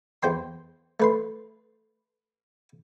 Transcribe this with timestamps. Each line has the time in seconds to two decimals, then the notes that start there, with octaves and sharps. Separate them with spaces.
0.23 E2 C5 G5 C6
1.00 A3 B4 C6